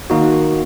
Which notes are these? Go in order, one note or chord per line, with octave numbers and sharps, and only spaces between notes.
D#3 A#3 D#4 F#4